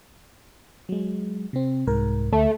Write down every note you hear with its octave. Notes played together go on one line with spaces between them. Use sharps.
F#3 G#3
C3 C4
C2 G#2 A#4
D2 A3